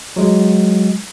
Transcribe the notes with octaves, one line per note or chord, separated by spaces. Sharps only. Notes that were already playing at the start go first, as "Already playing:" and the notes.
F#3 G#3